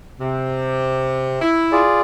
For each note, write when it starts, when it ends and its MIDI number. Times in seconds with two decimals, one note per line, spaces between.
0.20 1.41 48
1.41 1.81 64
1.72 2.01 65
1.72 2.01 68
1.72 2.01 74